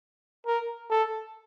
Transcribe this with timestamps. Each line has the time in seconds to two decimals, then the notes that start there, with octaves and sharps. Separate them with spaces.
0.46 A#4
0.90 A4